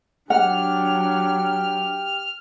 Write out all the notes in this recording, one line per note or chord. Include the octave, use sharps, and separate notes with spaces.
F#3 D4 G4 F#5 F6